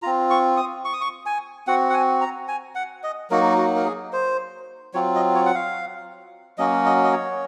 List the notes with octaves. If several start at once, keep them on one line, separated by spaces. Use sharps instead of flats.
C4 F4 A#5
C#6
D#6
C#6
D#6
C#6
G#5
C4 F#4 F#5
F#5
G#5
A#5
G#5
F#5
D#5
F#3 A#3 D#4 F#4 A#4
F#4
A#4
G#4
C5
F#3 C4 F4 C#5
D#5
C#5
F#5
F5
F#3 A#3 C#4 F#4 D#5
D#5
D#5
C#5